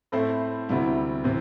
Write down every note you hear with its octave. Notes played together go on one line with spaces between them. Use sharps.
A2 A3 C4 E4 C5
D2 C3 G3 E4
C3 E3 C4